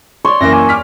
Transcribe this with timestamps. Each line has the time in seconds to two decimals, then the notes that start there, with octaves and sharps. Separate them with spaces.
0.25 C#5 D5 C6
0.40 F#2 E3 A#3 A#6
0.53 G#5
0.69 D6 F6 B6